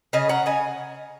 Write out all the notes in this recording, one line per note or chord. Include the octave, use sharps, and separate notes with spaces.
C#3 D#5 G#5
C#4 F#5 A#5
C#3 D#5 G#5